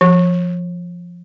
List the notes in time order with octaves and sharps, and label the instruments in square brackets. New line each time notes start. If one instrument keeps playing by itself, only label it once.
[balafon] F3